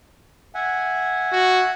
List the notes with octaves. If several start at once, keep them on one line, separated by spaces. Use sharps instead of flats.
E5 F#5 G#5
F#4